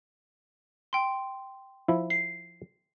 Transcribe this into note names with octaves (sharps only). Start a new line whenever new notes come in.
G5 C6
F3 E4
C7